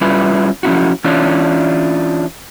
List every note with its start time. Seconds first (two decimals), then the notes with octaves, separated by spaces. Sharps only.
0.01 G3 C#4 E4 F4 B4
0.63 F3 C#4 E4 F#4
1.04 E3 C#4 D4 F4